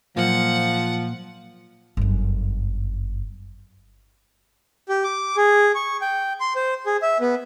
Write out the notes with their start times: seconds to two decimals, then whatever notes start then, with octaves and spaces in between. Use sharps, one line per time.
0.17 A#2 F3 F#3 F#5
1.97 G1 F#2
4.89 G4
5.04 D6
5.36 G#4
5.75 C#6
6.01 G5
6.40 C6
6.56 C5
6.86 G#4
7.02 E5
7.20 B3